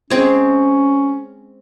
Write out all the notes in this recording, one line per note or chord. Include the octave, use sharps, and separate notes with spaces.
G#3 C4 C#4 G#4